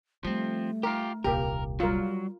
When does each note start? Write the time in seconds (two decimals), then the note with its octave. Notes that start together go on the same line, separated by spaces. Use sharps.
0.25 F3 G3 A3 C4
0.83 F4 G4 A#4
1.24 D#1 C2 A#3 G4 A#4
1.80 F#3 G3 F4 A#4